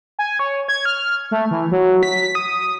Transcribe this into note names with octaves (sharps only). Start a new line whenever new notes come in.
G#5
C#5
G#6
F6
A3
E3
F#3
B6
D#6